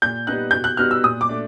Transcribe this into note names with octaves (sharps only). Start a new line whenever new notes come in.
A#2 G6
G3 B3 D#4 F#6
B2 G6
F#6
G3 B3 D#4 F#4 F6
E6
A#2 D#6
D6
A3 D4